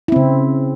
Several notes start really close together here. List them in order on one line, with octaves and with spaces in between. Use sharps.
E4 C4 C#3